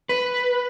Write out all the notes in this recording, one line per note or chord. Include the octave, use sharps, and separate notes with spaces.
B4